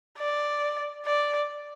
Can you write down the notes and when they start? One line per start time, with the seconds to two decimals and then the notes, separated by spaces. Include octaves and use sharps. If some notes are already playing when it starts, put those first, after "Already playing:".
0.18 D5
1.06 D5